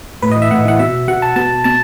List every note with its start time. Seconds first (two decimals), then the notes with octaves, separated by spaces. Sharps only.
0.22 A2 B4
0.31 E3 D#5
0.42 E5
0.51 A2 F#5
0.65 E3 F#5
0.79 B2 E5
1.08 B2 F#5
1.22 A5
1.36 B2 A5
1.64 B2 A5